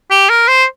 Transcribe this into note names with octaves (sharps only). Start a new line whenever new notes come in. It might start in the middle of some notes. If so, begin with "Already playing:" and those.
G4
A#4
C5